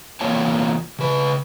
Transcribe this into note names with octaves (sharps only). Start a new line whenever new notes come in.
E2 C3 A#3 F4 C#5 A5
C#3 B4